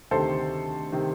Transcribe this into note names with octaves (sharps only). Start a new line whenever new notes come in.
D2 C3 D#3 A4 C5
C3 D#3